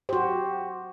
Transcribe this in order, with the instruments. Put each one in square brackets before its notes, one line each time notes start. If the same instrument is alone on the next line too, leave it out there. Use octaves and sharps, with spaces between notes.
[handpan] F#4 C5 [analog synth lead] G4